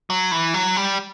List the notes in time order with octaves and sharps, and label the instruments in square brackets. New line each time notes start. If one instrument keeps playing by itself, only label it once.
[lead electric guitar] F#3
E3
F#3
G3